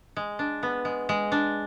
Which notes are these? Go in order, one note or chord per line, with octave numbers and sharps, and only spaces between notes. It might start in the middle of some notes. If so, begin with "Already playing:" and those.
G#3
D4
B3
G#3
G#3
D4